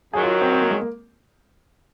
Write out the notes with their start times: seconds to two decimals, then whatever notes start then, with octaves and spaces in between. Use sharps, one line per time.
0.13 F#2 D#3 F#3 G#4
0.23 F4
0.41 C4
0.52 C4
0.62 A#3
0.71 G#3
0.81 A#3